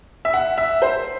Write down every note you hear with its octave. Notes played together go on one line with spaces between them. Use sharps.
E5
F#5
E5
C5